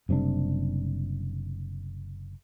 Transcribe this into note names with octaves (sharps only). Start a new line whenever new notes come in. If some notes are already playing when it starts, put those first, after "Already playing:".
F#1 C3 G3 D4